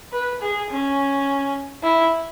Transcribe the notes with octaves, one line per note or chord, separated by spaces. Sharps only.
B4
G#4
C#4
E4